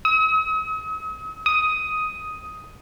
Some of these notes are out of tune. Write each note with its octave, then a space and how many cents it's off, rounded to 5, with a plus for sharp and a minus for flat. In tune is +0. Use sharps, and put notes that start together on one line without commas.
D#6 +45
D#6 +10